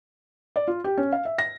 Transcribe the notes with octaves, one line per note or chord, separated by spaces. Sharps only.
D5
F4
G4
C#4
F5
E5
A#6